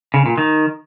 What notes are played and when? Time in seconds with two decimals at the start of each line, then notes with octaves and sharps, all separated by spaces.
0.14 C#3
0.26 A#2
0.38 D#3